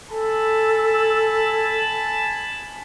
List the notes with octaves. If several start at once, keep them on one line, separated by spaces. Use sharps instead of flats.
A4 G#5 A5 B5